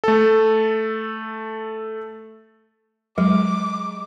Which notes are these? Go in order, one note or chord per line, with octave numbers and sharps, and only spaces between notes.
A3 A4
F#3 G#3 D6